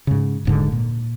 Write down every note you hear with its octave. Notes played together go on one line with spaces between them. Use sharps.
G#2 C#3
D#1 G#2 D3
A#2